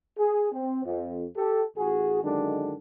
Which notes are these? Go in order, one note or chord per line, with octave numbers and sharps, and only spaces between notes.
G#4
C4
F2
G4 A4
A1 F#4 G#4
F#2 D3 D#3 G#3 D4